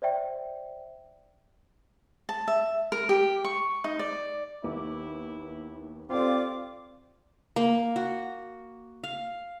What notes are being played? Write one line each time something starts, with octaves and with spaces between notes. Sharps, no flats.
C5 D5 E5 G5
A5
E5
A#4
G4
C#6
D#4
D5
D#2 B3 E4 D6
C4 F4 G4 A4 D5 F5 D6
A#3
F#4
F5